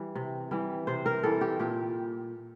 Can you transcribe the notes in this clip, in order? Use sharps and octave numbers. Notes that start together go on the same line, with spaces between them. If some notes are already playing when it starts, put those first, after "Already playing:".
Already playing: E3 G3
C3
E3 G3
C3 C5
A#4
E3 G3 A4
G4
A#2 G4